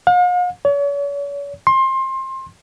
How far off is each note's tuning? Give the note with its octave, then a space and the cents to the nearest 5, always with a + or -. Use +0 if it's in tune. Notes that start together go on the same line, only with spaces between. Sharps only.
F5 +45
C#5 +40
C6 +25